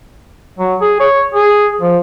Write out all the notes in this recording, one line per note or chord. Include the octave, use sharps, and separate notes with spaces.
F#3
G#4
C#5
G#4
F3